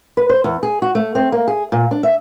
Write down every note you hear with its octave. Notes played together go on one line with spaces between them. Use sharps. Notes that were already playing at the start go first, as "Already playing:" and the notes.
B4
C5
E2
G#4
F#4
A3
C4
A#3
G#4
A#2
D4
E5